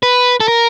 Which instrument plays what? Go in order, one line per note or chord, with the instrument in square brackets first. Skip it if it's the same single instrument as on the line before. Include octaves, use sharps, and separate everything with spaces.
[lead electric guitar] B4
A4
A#4